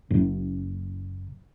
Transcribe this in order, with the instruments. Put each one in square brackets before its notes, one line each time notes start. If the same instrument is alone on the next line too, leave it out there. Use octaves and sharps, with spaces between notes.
[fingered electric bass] F#1 F#2